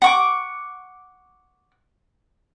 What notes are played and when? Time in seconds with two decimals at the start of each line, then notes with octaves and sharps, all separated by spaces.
0.02 F#5 C#6 D6